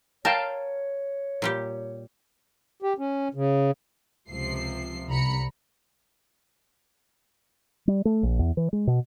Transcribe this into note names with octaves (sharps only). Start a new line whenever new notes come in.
A#4 C#5 F5 G5 A5
A#2 G3 G4
G4
C#4
C#3
C#2 C3 F3 C7
C2 A#5 B5 C#7
G3
A3
A#1
E2
E3
G#3
B2